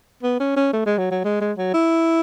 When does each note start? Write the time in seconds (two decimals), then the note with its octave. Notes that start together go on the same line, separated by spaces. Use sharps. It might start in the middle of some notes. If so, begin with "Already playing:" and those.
0.23 B3
0.40 C#4
0.57 C#4
0.73 A3
0.86 G#3
0.98 F#3
1.11 F#3
1.25 G#3
1.41 G#3
1.58 F#3
1.74 E4